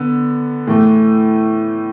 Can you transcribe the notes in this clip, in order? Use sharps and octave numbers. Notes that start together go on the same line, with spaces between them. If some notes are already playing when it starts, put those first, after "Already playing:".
Already playing: D3 B3
A2 E3 A3